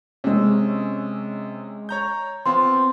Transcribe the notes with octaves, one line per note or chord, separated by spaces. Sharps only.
C3 G#3 C#4 E6
C#5 A#5 G6
B3 C4 F4 C6